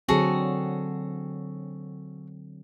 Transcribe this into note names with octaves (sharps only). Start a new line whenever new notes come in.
D3 F#3 C4 F#4 G#4 A4